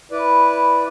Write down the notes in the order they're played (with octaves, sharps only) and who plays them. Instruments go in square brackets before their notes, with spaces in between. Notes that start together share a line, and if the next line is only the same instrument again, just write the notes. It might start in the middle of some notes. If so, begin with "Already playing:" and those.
[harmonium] E4 B4 D5